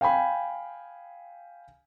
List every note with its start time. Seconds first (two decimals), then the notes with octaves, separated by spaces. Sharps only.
0.01 F5 G5 G#5 B5